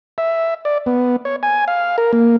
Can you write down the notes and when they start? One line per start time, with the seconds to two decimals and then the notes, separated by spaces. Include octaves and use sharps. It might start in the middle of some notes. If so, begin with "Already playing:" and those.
0.18 E5
0.65 D5
0.86 B3
1.25 C#5
1.43 G#5
1.68 F5
1.98 A#4
2.13 A#3